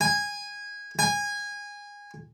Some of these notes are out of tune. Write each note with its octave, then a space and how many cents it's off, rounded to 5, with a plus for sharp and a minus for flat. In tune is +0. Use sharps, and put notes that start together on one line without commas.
G#5 -15
G#5 -20